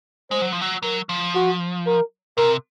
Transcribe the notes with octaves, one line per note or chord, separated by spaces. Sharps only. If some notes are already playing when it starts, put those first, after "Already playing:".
G#3 C5
F#3
F3
F#3
F#3 A#4
F3
F#4
A#4
C3 A#4